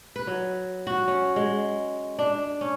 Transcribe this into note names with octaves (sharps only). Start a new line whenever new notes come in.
B4
F#3
F#4
C#4
G#3
D4
C#4